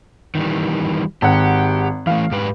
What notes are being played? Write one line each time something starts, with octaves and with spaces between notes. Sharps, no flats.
D#3 E3 G3
G#1 G4 F#5
E3 A3 F5
G#2 G4 B4